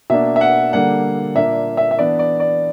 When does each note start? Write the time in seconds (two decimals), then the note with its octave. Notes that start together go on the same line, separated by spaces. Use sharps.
0.10 B2 A#3 D4 E5
0.36 E5
0.41 F#5
0.72 D3 G3 A#3 D4 F#5
1.35 A#2 A#3 D4 E5
1.77 E5
1.91 E5
1.99 E3 B3 D4 D5
2.19 D5
2.40 D5